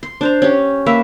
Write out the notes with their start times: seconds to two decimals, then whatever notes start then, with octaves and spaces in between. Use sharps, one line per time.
0.03 C6
0.21 D4 C5 A#5
0.42 C#4 G4
0.86 A#3 B4 E5